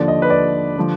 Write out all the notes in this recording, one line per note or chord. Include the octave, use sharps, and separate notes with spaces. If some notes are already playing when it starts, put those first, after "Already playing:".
Already playing: D#2 D3 F3 D5
D#5
B4
D5
D3 F3